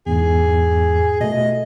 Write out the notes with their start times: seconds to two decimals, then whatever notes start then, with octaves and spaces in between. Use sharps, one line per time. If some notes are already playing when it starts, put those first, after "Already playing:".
0.06 E2 G#2 G#4
1.21 B2 A3 D#5